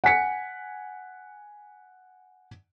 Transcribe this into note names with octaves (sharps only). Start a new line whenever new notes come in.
F#5 G#5 B6 C#7